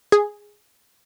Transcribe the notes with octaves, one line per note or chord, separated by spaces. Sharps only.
G#4